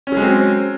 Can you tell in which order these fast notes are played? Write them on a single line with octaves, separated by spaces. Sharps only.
C#4 F#3 G#3 C4